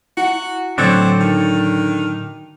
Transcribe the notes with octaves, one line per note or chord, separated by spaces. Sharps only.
E4 F#4 F#5
A2 D3 F#3 C4 D4 A4 C#5
D#3 G5